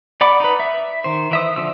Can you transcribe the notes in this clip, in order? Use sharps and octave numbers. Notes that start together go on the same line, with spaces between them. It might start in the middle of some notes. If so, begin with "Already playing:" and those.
D5 F#5 B5 D6
D#4 B4
E5
D#3 C5
E3 E5 D#6
D3 F3 E6